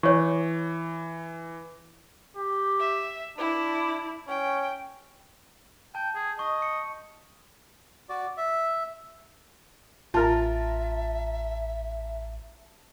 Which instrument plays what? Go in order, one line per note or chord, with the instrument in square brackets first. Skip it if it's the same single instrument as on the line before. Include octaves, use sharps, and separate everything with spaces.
[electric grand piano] E3 [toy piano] C#5 C#6
[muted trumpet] G4
[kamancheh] E5
[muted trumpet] D4 [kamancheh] E4
[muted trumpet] C#4 [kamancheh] G5
[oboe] G5 [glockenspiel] A5 G6
[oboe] G#4
[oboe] D#5 [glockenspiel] C#6
[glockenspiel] C#7
[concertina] F#4 D5
E5
[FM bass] A1 [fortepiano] F4 A#4 [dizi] E5 [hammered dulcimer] A5 A#5